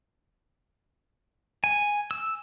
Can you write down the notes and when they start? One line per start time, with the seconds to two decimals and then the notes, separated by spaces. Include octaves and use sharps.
1.64 G#5
2.11 E6